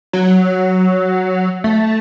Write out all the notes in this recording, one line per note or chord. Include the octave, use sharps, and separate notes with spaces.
F#3
A3